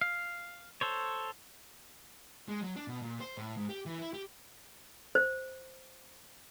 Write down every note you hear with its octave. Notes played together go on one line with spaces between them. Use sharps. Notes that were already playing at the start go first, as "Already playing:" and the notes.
F5
A4 C5 C#5
G#3
F#3
D4
B2
A#2
C5
A2
G#2
G4
E3
E4
G4
C5